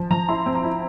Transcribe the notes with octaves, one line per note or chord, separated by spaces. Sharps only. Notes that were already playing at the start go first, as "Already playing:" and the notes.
Already playing: F3 A5
F3 A#5
E4 C6
C4
A#5
E4